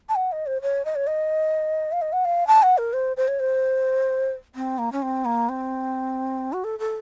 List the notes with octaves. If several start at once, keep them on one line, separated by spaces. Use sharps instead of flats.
A5
F#5
D#5
C5
C#5
D#5
C#5
D#5
F5
D#5
F#5
F5
A5
F#5
A#4
C5
C5
C#5
C5
C4
A#3
C#4
C4
A#3
C4
F#4
A4
A4